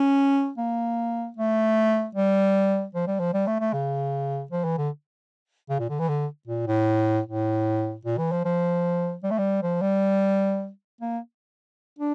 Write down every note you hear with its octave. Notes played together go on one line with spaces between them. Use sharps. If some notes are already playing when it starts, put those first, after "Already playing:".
Already playing: C#4
A#3
A3
G3
F3
G3
F3
G3
A3
A3
C#3
F3
E3
D3
C#3
A#2
D3
E3
D3
A#2
A2
A2
A#2
E3
F3
F3
G3
A3
G3
F3
G3
A#3
D4